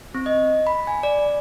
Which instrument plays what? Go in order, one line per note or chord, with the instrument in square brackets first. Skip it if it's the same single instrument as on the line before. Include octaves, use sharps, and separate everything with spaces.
[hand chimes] C4
D#5
B5
G#5
D5